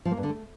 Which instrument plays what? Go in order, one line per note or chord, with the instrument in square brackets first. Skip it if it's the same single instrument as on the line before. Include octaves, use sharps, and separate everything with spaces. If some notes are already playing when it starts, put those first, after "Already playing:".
[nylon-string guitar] F3
A#3
G2
D3
A3